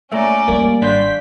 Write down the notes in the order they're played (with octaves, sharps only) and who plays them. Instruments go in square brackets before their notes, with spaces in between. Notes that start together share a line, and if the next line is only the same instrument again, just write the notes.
[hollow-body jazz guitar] A#2 A3 [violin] C#4 D5 [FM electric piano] E5 A#5
[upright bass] G3 [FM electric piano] A#3
[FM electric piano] G#1 C6 G6 [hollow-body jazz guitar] D4 D5 F5 [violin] B6